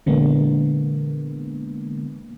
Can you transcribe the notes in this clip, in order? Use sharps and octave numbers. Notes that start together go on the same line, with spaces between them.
A#2 D3 E3 G#3 A#3 B3